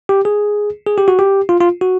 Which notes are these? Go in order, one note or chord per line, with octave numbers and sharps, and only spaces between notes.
G4
G#4
G#4
G4
F#4
G4
F4
F4
F#4